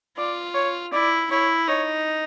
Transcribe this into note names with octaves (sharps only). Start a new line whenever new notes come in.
F4 D5
C#5
E4 D5
E4 C#5
D#4 C#5